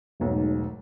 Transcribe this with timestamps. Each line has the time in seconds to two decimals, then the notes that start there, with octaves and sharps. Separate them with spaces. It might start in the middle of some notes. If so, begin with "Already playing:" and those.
0.20 E1 B1 G#2 A3